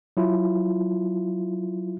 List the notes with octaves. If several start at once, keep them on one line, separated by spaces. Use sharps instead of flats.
F#3 E4 F4